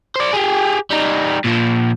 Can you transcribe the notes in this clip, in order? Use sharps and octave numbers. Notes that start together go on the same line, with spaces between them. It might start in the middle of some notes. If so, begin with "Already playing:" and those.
C5 D5
G4 G#4
G3 D#4
A#2 F3